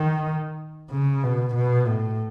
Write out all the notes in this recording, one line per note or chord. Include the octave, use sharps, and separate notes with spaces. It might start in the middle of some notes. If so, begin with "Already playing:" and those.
Already playing: D#3
C#3
B2
B2
A2